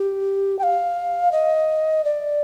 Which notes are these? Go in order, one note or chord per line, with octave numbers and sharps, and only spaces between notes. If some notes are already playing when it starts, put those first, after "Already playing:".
Already playing: G4
G5
F5
D#5
D5